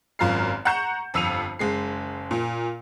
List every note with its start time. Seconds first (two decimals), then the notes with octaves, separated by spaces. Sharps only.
0.19 G#1 F#2 F4 A#5 F6 C7
0.65 F#5 A#5 C#6 G6 C#7 E7
1.14 G1 F2 E6 C#7 D#7 F7
1.59 F#1 G#3 C7
2.31 A#2